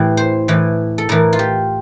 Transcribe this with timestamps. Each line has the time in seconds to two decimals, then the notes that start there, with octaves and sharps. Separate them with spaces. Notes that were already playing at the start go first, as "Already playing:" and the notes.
Already playing: A2 E3 G4
0.17 C5
0.48 A2 E3
0.98 A4
1.09 A2 E3 A#4
1.33 F4
1.39 G4